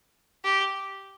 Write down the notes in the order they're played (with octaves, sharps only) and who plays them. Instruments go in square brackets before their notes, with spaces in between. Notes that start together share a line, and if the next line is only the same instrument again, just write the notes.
[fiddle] G4